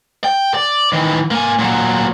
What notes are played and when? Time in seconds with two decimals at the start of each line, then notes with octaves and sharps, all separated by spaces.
0.24 G5
0.54 D5
0.92 D#3 E3
1.31 A#3 G#5
1.59 A#2 F#3